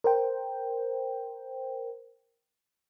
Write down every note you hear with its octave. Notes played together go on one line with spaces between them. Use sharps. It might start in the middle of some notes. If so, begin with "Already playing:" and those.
A#4 C5 G5